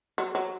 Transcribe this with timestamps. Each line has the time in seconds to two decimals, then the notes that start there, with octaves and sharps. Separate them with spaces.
0.18 F#3
0.35 F#3